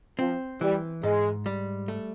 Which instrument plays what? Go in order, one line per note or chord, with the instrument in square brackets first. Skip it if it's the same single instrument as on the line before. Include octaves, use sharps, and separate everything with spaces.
[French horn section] F3 [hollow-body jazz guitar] C4
[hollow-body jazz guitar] E3 [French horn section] G3
[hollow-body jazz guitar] G#2 [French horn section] G#3
[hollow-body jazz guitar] G3
A3